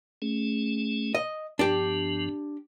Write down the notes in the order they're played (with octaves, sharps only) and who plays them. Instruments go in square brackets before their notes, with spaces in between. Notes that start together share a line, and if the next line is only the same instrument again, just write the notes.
[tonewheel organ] A3 C#4 G#4
[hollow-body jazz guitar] D#5
[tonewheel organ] G2 F3 B3 [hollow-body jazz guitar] D4 G4